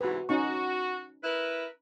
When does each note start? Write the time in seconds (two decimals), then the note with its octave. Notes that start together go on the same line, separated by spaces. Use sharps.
0.01 G#2 C3 E3 F#4 B4
0.29 C#4 D#4 F#4 C#6
1.24 E4 A#4 B4